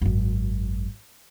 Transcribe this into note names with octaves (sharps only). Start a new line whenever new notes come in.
G#1 F#2